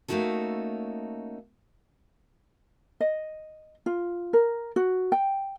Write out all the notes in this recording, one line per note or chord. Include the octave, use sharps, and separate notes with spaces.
A3 A#3 C#4 D#4 F#4 A4
D#5
F4
A#4
F#4
G5